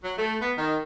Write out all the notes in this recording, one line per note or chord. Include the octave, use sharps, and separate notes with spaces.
F#3
A3
B3
D#3